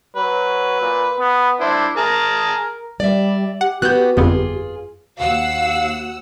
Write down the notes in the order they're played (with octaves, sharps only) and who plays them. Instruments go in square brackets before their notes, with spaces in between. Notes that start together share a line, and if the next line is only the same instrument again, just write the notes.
[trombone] F#3 [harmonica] B4
[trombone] A#2
B3
[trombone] D4 [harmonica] E4 C5
[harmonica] G#4 A5 A#5 [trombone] A#4
[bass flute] G3 [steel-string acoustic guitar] D5 E5
[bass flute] G4 [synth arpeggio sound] F#5
[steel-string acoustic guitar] B3 F#4 [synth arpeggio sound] F#6 G6
[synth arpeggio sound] G1 F2 B3 [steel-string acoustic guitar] F4 G#4
[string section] D#2 F#5 E6 [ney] F#4 [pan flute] F5